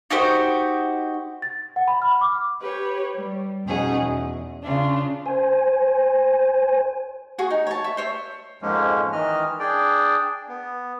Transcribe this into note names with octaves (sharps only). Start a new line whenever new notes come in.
D#4 F#4 G4 C5
A6
F#5
B5
F6
D6
G4 B4 C#5
G3
F2 B2 C#4 D#4 G#4 F#5
E2
C#3 D4 F4
C5 G#5
F#4 G#4 G#5 C#6
D#4
C#5 A5
E5 C#6
C5 C#5 E5
F2 G#2 F3 G#3 A#3 C#4
D#3 E3 D#5 F6
D4 G#4 D5 G5
B3